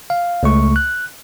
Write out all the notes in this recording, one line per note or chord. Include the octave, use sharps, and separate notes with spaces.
F5
C#2 A3 C#6
F#6